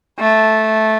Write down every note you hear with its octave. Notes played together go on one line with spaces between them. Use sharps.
A3